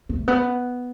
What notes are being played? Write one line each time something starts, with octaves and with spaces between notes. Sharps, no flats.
A3
B3